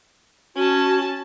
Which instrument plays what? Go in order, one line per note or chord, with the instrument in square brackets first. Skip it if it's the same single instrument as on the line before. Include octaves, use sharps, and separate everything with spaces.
[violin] C#4 A5 [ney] F#4